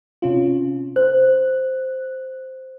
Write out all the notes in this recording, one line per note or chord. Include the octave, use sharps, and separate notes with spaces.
C3 C#4 F4
C5 F#6